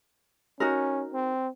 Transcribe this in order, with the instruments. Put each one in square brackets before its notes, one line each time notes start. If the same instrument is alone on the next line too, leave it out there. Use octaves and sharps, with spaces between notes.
[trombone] C#4 [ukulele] D#4 F#4 A#4
[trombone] C4